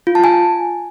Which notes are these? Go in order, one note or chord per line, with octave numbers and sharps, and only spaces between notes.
F4
A5
G#5